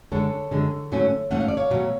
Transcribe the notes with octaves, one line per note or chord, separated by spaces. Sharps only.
F#2 D3 G#3 A4 C#5
F#2 D3 G#3
G#2 F#3 A3 C#4
G#2 F#3 A3 C#4 F#5
F5
D5
C#5 F5
B2 F#3 A3